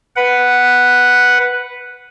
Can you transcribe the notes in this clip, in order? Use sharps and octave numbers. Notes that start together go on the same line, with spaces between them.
B4 F#5